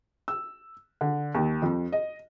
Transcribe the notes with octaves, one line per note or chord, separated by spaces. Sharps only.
E6
D3
D#2
F2
D#5